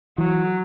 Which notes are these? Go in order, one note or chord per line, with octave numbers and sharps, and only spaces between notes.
E3 F#3